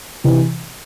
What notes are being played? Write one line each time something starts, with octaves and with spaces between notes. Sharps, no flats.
C3 E3